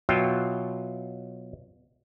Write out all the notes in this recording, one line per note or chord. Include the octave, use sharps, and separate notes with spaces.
B2 F#3 F4 E5 F5 G5